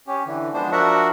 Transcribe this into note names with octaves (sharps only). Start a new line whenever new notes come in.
C#4 G4
D3 E3
F3 G#3 B3 D4 C5
F3 D4 F#4 A#4 E5 F#5